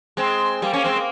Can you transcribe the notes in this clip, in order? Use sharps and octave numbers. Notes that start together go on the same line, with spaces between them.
G#3 C4
G3 A#3
A#3 C#4
G#3 C4
A#3